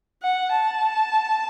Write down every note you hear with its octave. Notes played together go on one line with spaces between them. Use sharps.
F#5
A5